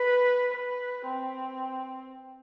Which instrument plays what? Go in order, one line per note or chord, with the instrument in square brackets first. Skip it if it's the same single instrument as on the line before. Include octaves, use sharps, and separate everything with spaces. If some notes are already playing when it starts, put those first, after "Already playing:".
Already playing: [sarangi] B4
B4
C4